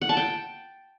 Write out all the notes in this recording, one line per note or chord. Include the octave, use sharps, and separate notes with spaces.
F#5
A5
G5